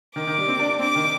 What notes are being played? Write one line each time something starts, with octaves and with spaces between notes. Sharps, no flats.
D#3 D6
D#3
G3
C4
D4
D4
C4 D6
D#3